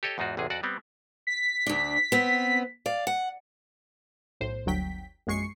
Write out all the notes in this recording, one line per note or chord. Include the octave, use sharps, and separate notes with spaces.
G4 A4 C#5 D#5
E2 G#2 D#4 F4 F#4
A1 E2 C3 G#4
F2 F#4 D5 F#5
G3 B3 C4
B6
D2 D4
B3 C4
D5 F5
F#5
B1 A2 C5
G1 D2 F#3 G5 B6
A#1 F#2 G#3 C#6 C7 C#7